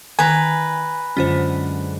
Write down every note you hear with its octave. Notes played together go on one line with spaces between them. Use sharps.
D#3 B4 G5 G#5 A#5
F#2 D3 G#3 C#4 F4 C5